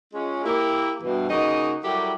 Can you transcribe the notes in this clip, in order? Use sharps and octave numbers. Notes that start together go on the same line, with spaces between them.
G#3 C#4 F4
A#3 E4 G4
G2 B2 E3
C#3 A#3 D#4 F#4 G#4 D#5
F#3 G3 E4 G4 A4 A#4